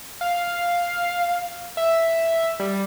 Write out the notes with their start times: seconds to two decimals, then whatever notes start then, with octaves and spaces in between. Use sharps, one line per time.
0.21 F5
1.77 E5
2.60 G3